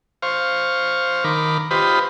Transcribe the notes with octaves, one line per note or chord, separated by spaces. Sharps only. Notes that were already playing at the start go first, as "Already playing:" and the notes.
C5 F5 C#6
D#3 A#4 B5 D6
F4 G4 B4 C5 D#5 B5